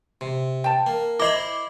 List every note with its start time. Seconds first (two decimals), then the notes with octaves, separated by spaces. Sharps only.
0.21 C3
0.64 G5 A5
0.86 A#3
1.20 E4 C5 D#5 A#5 B5 D6